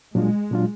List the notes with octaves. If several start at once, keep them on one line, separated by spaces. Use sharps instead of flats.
A#2 F#3 G#3 D4 F4
A#2 F#3 D4 F4